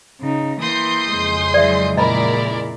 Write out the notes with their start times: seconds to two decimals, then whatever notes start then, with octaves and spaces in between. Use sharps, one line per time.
0.21 C#3 D#4
0.60 E3 A#3 C6 D#6 G6
1.07 F2 C#3 G#3
1.54 E3 F#3 D5 E5
1.97 A#2 E4 A#4 D5 D#5 A#5 B5